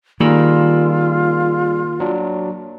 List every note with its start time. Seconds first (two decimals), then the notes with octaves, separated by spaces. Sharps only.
0.20 D#3 G3 A#3 F4 G#4 E6
2.00 F#3 D4